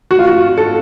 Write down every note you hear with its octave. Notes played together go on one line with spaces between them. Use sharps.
F#4
F4
F#4
A4